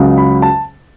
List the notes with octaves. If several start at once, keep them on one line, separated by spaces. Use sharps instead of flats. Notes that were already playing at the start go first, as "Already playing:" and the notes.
Already playing: C#2 C#3 F#3
B5
A5